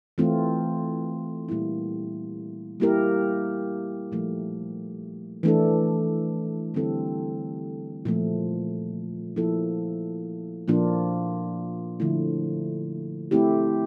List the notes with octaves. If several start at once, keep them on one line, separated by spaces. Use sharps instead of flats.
E3 A3 C4 F4
A#2 G3 A#3 E4
G3 A#3 E4 G4 A#4
A#2 F3 A3
E3 A3 D4 A4
D3 G3 C4 E4 A4
A#2 F3 A3
F3 A#3 E4 A4
A#2 F3 A#3 D4 F4
D3 F3 A3 E4
A3 C4 E4 G4